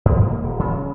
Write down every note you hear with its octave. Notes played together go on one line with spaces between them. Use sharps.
G2
A#3
D#1
C#3